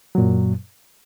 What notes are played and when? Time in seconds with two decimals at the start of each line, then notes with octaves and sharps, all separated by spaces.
0.15 F#3
0.18 A#2
0.21 F#2